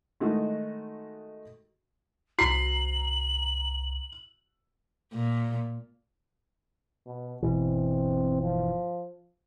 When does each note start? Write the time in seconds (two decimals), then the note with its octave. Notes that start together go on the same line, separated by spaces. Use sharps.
0.20 D#3 G#3 A3 D#4 F#4
2.39 C2 F#4 A#5 C7 F#7
5.14 A#2
7.06 B2
7.43 G1 B2 E3 C4
8.42 F3